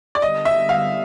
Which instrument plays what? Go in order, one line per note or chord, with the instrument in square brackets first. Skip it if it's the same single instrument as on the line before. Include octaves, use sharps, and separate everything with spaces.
[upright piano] D5
[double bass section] D3 G3 B3 [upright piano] D#5
[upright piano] E5
F5